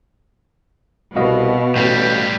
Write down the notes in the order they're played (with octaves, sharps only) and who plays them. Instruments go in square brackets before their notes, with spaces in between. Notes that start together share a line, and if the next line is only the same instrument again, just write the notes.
[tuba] C2 [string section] B2 [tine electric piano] F#4 D#5 F5
[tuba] A1 [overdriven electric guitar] A2 G3